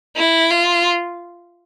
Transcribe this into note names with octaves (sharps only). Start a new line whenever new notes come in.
E4
F4